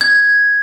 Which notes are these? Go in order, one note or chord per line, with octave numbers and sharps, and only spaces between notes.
G#6